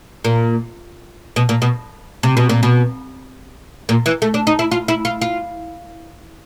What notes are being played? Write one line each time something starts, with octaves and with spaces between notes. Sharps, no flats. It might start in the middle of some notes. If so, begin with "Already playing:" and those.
A#2
B2
A#2
B2
C3
B2
A#2
B2
A#2
E3
A3
D4
D#4
E4
F4
E4
F4
F4